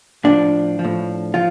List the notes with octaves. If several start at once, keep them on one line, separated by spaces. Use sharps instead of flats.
A2 F3 D4
F3
A2
F3 F4